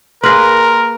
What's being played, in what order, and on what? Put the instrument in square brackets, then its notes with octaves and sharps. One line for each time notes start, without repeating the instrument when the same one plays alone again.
[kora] A#3 G#4 B4 [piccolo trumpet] A#4 [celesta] C6 F6 A#6